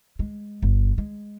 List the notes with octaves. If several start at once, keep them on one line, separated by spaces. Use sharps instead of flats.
G#3
G1
G#3